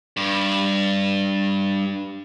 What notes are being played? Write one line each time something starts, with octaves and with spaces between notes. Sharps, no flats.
G2